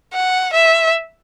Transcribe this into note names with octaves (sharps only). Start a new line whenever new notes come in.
F#5
E5